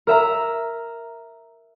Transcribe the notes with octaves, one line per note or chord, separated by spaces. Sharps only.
A#4 E5 A#5